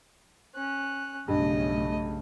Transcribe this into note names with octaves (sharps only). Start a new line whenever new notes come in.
C#4 F#6
B1 G2 C#3 A3 D#5